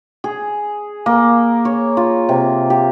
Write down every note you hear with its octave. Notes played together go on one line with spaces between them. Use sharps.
G#4
A#3
C#5
F4
C3
G4